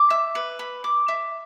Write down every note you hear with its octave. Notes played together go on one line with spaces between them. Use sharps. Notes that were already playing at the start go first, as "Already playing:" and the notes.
Already playing: D6
E5
B4
B5
D6
E5